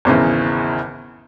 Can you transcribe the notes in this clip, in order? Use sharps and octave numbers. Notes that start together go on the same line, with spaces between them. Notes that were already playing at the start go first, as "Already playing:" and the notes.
G#1 E2 C#3 E3